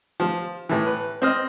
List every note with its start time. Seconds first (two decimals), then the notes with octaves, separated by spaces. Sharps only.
0.20 F3
0.69 A2 E3
0.87 B4
1.22 C4 D#5 F6